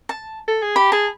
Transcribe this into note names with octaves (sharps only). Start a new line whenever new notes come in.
A5
A4
G#4
G4 B5
G#4 A5